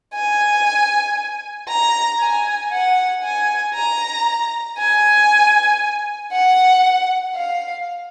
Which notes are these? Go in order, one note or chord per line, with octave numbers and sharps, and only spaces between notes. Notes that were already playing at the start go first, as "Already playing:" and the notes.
G#5
A#5
G#5
F#5
G#5
A#5
G#5
F#5
F5